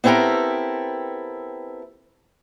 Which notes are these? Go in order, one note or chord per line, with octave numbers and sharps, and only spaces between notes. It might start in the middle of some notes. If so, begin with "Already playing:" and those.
B3 C4 E4 G4 A4 A#4